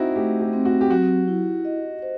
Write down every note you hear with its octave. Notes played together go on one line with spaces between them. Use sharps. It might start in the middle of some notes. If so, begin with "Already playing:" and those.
Already playing: C4 D#4 E4 F#4
A3 G4
G4
C4
F#4
G4
F#3 F#4
E4
D#5
C5